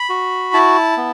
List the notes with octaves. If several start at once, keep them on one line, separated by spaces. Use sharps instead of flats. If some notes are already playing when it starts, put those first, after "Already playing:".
Already playing: B5
F#4
E4 A5
B3